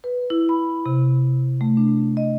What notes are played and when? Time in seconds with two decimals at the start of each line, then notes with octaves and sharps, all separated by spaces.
0.04 B4
0.30 E4
0.49 B5
0.86 C3
1.61 A3
1.77 D4
2.17 D#5